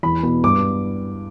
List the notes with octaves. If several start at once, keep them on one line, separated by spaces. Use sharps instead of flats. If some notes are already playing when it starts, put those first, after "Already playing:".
E2 B5
B2
G2 D6